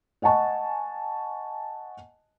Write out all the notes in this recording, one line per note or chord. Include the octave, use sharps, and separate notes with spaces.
D#5 F#5 G#5 A5 C#6